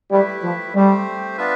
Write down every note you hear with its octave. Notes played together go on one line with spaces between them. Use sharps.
G3 A3 E4 G4 B4 E5
F3
G3 A3 C4 G4 C5
B3 D4 F4 B4 E5